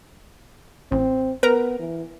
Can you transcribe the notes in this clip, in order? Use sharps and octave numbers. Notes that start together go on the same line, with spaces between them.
A1 C4
B3 A#4 B4 A#5
E3